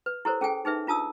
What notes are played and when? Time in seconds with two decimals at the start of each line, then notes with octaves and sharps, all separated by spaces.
0.06 B4
0.25 E4 G4 A4 A#4 C5 C#5
0.41 C#4 G#4 A4 G5 G#5
0.65 D#4 G#4 B4 E5
0.87 D4 F4 A5 D#6 E6